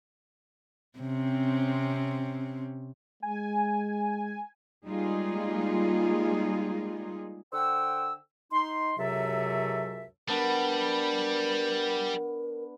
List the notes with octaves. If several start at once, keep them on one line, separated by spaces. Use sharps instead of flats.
C3 C4 C#4
G#3 G#5
G3 G#3 A#3 D#4 F4 G#4
D3 C5 F#5 G5 E6
D#4 C6
C#2 F#2 C3 F#3 A4 E5
G3 B3 D4 A#4